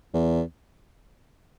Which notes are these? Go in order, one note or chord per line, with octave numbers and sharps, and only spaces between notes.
E2